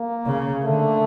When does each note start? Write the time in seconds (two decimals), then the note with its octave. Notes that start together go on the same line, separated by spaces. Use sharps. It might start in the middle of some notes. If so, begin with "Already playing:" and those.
Already playing: A#3
0.26 C#3
0.63 D3 A3